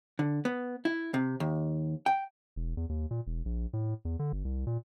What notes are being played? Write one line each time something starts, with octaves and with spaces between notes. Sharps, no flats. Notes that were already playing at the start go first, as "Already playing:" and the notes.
D3
B3
E4
C3
D#2
G5
E1
E2
D#2
A#2
E1
A#1
A2
E2
D3
G1
C2
A#2